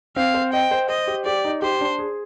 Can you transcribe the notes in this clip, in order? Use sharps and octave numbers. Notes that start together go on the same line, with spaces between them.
C4 F5
C5
D#5 G5
C5
C5 D#5
G4
G4 D5
D#4
G4 C5
D4
G#4